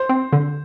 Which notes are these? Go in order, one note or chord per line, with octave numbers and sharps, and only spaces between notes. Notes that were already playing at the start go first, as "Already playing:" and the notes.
Already playing: C5
C4
D3